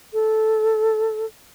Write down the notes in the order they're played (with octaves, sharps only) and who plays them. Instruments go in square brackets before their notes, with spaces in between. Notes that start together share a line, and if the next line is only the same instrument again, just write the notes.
[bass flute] A4